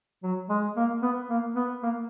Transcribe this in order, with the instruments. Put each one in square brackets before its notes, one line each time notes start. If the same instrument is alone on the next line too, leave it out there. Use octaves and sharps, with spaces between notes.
[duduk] F#3
G#3
A#3
B3
A#3
B3
A#3